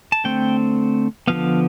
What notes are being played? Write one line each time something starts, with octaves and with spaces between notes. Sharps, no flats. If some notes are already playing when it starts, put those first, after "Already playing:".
A5
D3 A3 C4 G5
D3 F3 B3 F5